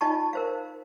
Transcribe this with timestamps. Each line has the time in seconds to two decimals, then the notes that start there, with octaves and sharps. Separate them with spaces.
0.01 D#4 F4 D#5 G#5 A5 C#6
0.33 A#4 C5 F5